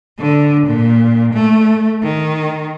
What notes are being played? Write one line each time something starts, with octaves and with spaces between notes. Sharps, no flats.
D3
A#2
A3
D#3